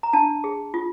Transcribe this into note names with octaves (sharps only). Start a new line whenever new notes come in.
A#5
D4 A5
G#4
F4